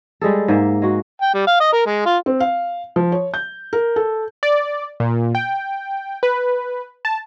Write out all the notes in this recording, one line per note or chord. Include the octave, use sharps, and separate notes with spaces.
G3 G#3 G#4 A4
G#2 A#3 E5
G#3 F#4
G5
G3
F5
D#5
A#4
G#3
F4
C4
F5
F3
C#5
G6
A#4
A4
D5
A#2
G5
B4
A5